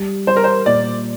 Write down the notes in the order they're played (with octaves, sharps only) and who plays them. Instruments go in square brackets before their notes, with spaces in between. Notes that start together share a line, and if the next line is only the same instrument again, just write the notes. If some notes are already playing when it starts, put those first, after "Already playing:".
Already playing: [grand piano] G3
[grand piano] G3 [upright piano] C5
[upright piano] A#4
C5
[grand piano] A#2 [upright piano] D5